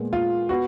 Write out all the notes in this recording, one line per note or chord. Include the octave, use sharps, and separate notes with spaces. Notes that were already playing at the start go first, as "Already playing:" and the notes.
Already playing: A#2 G#3 B3
F4
B3 F#4